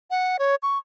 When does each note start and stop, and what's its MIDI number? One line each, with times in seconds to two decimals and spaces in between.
0.11 0.37 78
0.39 0.55 73
0.63 0.78 85